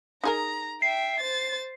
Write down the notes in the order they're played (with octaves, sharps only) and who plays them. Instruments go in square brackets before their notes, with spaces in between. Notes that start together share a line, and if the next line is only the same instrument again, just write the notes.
[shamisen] D#4 G#4 A#4 [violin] A#5
[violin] E5 G5 [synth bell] C7
[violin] C5 A6